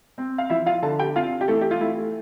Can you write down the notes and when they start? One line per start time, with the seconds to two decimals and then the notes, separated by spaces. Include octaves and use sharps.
0.18 C4
0.38 F5
0.50 F3 E4 E5
0.66 F4 F5
0.82 D3 A4 A5
0.99 G4 G5
1.16 C4 F4 F5
1.41 G4
1.48 E3 A3 A4
1.61 G4
1.71 F4
1.81 A3 E4